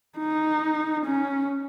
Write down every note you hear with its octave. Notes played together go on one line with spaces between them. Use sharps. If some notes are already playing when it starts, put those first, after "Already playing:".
D#4
C#4